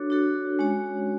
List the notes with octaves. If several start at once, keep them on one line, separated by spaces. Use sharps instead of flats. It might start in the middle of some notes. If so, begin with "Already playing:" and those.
Already playing: D4 F#4 A4 C#5
D4 F#4 A4 C#5
G#3 C#4 F#4 C#5